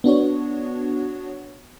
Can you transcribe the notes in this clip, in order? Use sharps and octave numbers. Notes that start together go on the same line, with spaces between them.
B3 D4 F#4 C#5